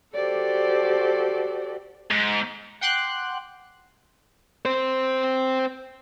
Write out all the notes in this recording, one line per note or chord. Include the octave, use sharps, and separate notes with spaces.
F#4 G4 A4 C5 D5
G#2
F#5 G5 C6 D6 F#6
C4 C5